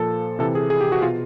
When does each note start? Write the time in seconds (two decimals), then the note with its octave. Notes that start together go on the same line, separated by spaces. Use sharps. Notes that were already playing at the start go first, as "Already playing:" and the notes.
Already playing: A#2 F3 A4
0.39 C3 E3 A4
0.55 G#4
0.70 G#4
0.81 G4
0.92 F#4
1.02 B2 F4